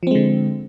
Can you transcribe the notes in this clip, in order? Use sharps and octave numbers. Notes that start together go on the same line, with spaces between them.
D3 F3 G#3 C4